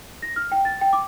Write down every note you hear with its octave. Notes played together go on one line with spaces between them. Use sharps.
A#6
F6
G5
A6
G5
D6